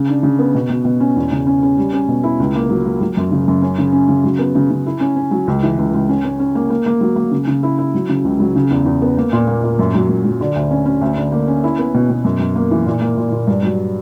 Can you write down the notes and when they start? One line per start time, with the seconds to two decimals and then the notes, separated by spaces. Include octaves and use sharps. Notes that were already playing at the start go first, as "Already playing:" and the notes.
Already playing: C#3
0.09 D4
0.23 C#3
0.39 B3
0.55 B2
0.70 B2
0.85 B2
1.00 C#4
1.16 E2
1.31 C#3
1.47 C#4
1.62 C#4
1.77 G3
1.93 C#4
2.08 B2
2.23 E4
2.40 C#2
2.55 A#3
2.70 F#3
2.85 A#3
3.01 F#3
3.17 F#2
3.32 C#3
3.48 F#2
3.62 C#4
3.78 C#3
3.93 C#4
4.09 C#3
4.24 F#3
4.39 B3
4.55 C#3
4.71 C#3
4.86 E4
5.00 C#4
5.16 C#4
5.31 F#3
5.47 C#2
5.63 E3
5.78 C#2
5.94 C#2
6.09 C#4
6.25 C#4
6.39 C#4
6.55 A#3
6.70 A#3
6.86 A#3
7.01 F#3
7.16 A#3
7.31 C#3
7.47 C#3
7.63 E4
7.78 E4
7.94 F#3
8.09 C#3
8.25 C#2
8.40 F#3
8.56 C#3
8.71 E2
8.85 E2
9.02 B3
9.17 A#3
9.33 A#2
9.47 A#3
9.64 A#2
9.79 F#2
9.94 F#3
10.09 F#2
10.24 F#3
10.41 D3
10.55 D2
10.71 C#4
10.86 C#4
11.01 D2
11.17 D3
11.32 A#3
11.48 C#4
11.64 E4
11.79 B3
11.94 B2
12.10 B2
12.24 F#2
12.40 F#2
12.56 A#3
12.71 E3
12.86 A#2
13.01 A#3
13.17 A#2
13.32 A#2
13.47 G2
13.63 F#3